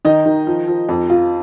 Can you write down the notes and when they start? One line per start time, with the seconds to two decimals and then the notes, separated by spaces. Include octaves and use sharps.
0.05 D#3 D#4 D#5
0.26 D#3
0.47 F3
0.68 F3
0.89 F2
1.10 F4